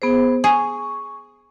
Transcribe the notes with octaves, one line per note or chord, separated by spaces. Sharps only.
B3 G#4 C5
G#4 C#6